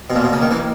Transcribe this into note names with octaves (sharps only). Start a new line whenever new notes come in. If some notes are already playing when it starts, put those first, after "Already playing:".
B2
A#2 A#3
B2
C#3 A#3
D#3
E3 A#3